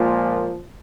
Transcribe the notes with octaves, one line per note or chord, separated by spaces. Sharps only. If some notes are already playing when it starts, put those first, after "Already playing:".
Already playing: A#2 F3 G#3 A#3